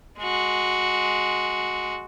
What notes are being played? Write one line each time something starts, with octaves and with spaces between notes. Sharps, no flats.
G#3 F#4